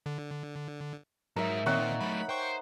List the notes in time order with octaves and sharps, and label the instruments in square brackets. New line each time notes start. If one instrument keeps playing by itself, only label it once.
[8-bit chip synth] D3
[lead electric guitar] G#2 D#4 [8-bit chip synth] F#3 [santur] A#4 E5
[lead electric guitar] A#2 [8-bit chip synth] D#3 C4 [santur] D#4 C#5 F#5
[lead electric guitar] F#3 A3 [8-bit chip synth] B5
[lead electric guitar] C5 [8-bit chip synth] G5 C#6